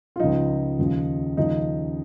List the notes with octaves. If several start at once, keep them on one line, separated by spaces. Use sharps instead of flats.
F4
C#2 C#3 F3 D#4
D#2 C#3 F3
D#2 C#3 F3 D#4